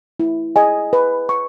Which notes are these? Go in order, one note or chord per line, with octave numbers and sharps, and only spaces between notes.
E4
G#4 D#5 G#5
B4
C#6